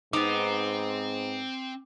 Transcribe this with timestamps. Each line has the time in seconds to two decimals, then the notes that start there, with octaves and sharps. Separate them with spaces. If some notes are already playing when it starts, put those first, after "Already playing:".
0.13 G#2 B3 C4 D#4 D6